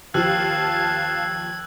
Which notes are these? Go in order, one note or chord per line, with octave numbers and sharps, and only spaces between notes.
D#2 F3 F5 A5 E6 F#6 G#6 F#7